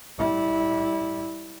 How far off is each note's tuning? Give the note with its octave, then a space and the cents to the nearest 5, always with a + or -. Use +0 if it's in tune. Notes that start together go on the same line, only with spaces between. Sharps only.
G3 -5 E4 -20